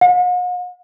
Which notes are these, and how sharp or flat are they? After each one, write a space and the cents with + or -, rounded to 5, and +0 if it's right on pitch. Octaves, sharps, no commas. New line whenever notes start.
F#5 -45